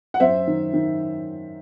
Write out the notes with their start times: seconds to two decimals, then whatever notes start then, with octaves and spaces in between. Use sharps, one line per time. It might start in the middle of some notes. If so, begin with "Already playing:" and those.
0.14 F#5
0.20 F#2 C5 E5
0.47 D#3
0.74 D#3